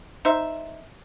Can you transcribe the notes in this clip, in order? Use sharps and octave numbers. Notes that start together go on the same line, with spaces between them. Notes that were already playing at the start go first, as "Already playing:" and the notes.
D#4 C5 E5